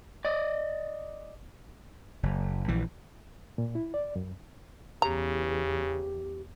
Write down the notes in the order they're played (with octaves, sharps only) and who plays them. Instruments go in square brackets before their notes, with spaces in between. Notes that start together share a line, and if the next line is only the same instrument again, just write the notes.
[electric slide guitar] D5 D#5
[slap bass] F#1
A#1 E3
[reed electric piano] A#2
E4
D5
F#2
[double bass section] E2 [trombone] C#3 [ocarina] G4 [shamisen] A#5